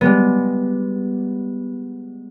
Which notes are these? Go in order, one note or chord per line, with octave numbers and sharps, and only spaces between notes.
G3 G#3 B3